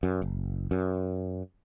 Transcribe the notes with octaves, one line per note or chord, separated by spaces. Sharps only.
F#2
F#1
F#2